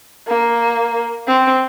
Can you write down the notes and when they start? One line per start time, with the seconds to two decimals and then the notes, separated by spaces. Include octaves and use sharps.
0.27 A#3
1.27 C4